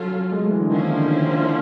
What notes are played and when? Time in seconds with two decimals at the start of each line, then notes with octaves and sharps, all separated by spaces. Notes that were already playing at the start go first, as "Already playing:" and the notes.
Already playing: F#3 C#4 F4 A4
0.13 F#3
0.32 G#3
0.41 A3
0.51 E3
0.60 D3
0.70 D#3 F3 A#3 C#4 E4
0.89 D3
1.08 D#3
1.27 D3